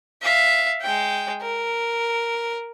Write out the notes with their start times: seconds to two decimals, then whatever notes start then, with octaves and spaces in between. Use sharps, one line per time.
0.22 E5 F5
0.81 G#3 G5
1.41 A#4